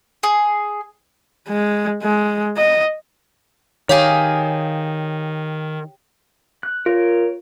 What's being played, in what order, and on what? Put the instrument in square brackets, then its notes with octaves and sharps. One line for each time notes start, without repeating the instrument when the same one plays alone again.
[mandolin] G#4
[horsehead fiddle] G#3
G#3
D#5
[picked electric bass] D#3 [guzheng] G4 G#4 [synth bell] C#5 F5
[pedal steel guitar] F#6
[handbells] F4 [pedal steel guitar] A#4 C#5